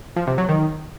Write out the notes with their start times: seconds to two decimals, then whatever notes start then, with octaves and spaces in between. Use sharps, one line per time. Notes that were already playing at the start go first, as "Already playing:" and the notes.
0.16 F3
0.27 C3
0.38 F#3
0.49 D#3